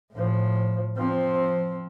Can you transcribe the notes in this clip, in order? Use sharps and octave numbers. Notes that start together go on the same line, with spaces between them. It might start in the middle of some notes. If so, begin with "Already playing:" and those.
A2 F3
F3 C4